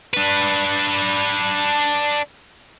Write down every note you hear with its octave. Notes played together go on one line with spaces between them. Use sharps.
D4 B4